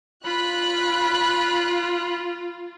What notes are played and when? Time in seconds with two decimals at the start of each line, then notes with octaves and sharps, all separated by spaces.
0.25 F4 B5 F#6